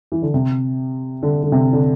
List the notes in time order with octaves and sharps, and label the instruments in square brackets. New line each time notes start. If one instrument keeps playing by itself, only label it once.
[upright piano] E3
D3
C3
D3
D3
C3
D3